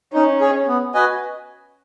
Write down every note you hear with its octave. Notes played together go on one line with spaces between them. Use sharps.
C#4 D#4
G#4 C#5
B3
F#4 B4 D#5 G#5